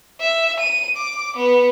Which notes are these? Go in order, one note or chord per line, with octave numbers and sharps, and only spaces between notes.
E5
D#7
D6
B3